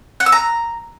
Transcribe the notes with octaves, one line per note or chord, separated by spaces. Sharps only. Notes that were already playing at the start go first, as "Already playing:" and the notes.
F#5
E6
A#5